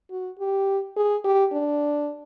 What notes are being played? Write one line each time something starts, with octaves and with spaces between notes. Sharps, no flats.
F#4
G4
G#4
G4
D4